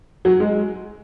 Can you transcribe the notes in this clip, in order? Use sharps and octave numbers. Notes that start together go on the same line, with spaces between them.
F#3
G#3